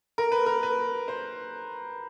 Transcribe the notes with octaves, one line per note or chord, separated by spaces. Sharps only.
A#4
B4
A#4
B4
C5